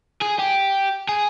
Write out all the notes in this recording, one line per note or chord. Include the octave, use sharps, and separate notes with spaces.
G#4
G4
G#4